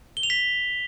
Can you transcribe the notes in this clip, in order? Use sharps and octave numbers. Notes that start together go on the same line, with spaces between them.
G7
F7
B6